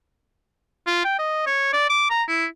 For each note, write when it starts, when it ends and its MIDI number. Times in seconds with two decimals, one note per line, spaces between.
0.87 1.01 65
1.05 1.18 79
1.19 1.46 75
1.47 1.69 73
1.73 1.89 74
1.90 2.06 86
2.10 2.23 82
2.29 2.46 64